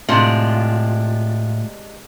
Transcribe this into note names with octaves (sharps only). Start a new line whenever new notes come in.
A2 C3 G#3 D4 F4